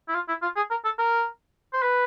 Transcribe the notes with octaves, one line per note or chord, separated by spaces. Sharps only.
E4
F4
E4
F4
G#4
A#4
A4
A#4
C5
B4